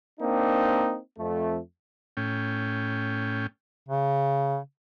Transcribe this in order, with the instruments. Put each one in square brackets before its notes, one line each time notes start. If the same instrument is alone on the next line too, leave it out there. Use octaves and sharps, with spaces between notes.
[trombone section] A#3 C4 D4 D#4
F2 A3
[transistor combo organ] A2 C#4 G5
[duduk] C#3